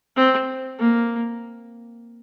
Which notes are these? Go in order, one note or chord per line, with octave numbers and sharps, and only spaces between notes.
C4
A#3